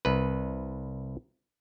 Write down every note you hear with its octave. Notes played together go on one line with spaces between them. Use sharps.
C2 B4